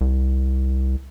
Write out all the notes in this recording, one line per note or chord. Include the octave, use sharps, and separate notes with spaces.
C2